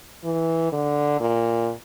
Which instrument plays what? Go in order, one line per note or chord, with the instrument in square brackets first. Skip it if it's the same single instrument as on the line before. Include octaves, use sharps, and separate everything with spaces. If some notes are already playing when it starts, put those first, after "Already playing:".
[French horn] E3
D3
A#2